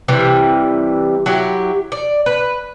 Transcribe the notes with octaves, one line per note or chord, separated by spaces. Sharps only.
C3 E3 G3
F#3 E4 G4
D5
B4